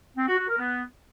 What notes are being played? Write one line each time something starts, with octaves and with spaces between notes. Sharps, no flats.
C4
F#4
F#4
A#4
B3